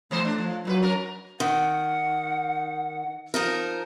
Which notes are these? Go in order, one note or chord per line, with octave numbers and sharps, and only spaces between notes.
E2 E3 A3 C5
D4
F3
A#2 F#3 D#4 B4
C#4 A#4
D#3 F#5
F3 D#4 A#4